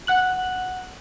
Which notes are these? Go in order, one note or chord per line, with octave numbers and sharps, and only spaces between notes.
F#5 F#6 F#7